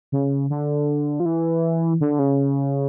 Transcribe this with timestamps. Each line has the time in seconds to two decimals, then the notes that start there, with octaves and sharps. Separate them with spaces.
0.12 C#3
0.50 D3
1.20 F3
1.26 E3
2.01 D3
2.19 C#3